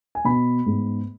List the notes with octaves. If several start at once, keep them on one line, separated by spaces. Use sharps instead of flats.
G#5
B2 B3 B5
G#2 G#3 B3